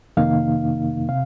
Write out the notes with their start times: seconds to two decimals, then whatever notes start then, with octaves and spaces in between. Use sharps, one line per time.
0.17 F2 C3 D#3 A#3 D#4 F5
1.09 C3 F5